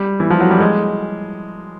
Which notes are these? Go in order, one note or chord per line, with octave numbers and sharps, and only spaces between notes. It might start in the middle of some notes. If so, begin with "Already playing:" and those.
Already playing: G3
E3
F3
F#3
G3
G#3